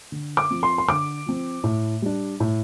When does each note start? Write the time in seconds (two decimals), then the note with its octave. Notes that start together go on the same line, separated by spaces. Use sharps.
0.12 D3
0.37 D6
0.50 F3 C4
0.63 C6
0.78 C6
0.88 D3 D6
1.26 F3 C4
1.64 A2
2.02 G3 D4
2.40 A2